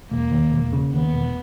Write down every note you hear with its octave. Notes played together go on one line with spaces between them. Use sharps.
E1 A#3
D#2
E1
C#3
D#2 B3
E1